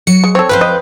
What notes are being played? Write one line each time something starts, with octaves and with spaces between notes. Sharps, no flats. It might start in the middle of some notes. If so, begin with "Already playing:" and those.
F#3 C#7
G#3
C4 A4 C#5
F2 B4 C5 F5 G5
D#5